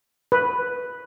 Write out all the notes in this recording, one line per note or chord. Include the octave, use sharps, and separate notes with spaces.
B4